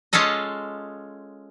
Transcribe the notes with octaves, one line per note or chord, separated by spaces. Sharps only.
G#3 C#4 F4 A4 D#5